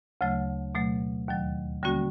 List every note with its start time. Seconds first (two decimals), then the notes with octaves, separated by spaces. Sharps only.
0.21 D2 C#3 F#3 A3
0.75 B2 F#3 A3
1.28 D#2 D#3 F#3
1.83 D3 G3 A#3 C#4 F#4